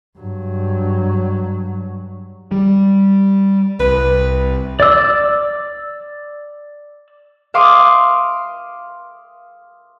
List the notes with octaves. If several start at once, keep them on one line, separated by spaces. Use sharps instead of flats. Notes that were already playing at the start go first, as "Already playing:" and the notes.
G2 F#3
G3
C2 B4
D5 E6
E5 F5 C6 D6 D#6 F6